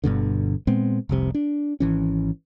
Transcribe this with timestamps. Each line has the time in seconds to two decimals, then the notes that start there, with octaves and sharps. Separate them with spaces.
0.04 G1 G2 B2 D3
0.67 A#2 G#3 B3 C4
1.09 F1 C2 C3
1.35 D4
1.80 G#1 E3 C#4